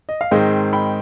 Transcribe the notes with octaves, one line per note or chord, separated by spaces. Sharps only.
D#5
F5
G#2 D#3 G#3 C4 D#5 G5
G5 B5